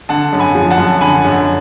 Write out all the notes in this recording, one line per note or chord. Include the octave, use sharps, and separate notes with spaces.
D3 F#5 A5
F#2
G#5 B5
F3
F#5 A5
F#2
D3 G#5 B5
F#2